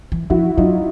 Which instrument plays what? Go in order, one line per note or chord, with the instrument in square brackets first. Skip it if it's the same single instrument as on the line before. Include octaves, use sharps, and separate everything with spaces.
[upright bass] E3
[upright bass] F3 [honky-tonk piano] E4 F#4
[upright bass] F#3 [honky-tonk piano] D#4 F4